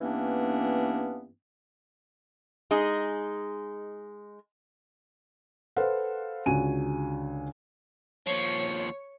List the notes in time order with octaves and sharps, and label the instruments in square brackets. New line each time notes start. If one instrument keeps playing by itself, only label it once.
[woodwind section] G2 E3 A#3 B3 C#4 D4
[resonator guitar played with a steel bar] G#3 D#4 G#4
[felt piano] A4 B4 C5 F5 F#5
C#2 D3 F#4 G#5 D#7
[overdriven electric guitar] D#2 F3 [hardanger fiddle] C#5